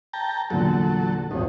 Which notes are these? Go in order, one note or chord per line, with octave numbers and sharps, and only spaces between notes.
G5 A5 A#5
E2 A#2 D3 F#3 A4
D#1 G#1 D#3